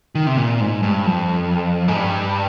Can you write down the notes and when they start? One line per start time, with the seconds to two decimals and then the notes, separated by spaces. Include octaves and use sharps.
0.15 D#3
0.27 C3
0.37 A#2
0.61 G#2
0.83 G2
1.06 F2
1.88 G#2
1.96 G2